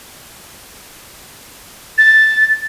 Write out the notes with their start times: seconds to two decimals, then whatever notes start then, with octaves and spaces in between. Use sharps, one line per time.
1.98 A6